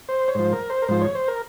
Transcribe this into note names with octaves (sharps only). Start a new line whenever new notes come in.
C5
C#5
G#2 F3 C5
A#4
C5
A#4
G#2 F3 C5
C#5
C5
A#4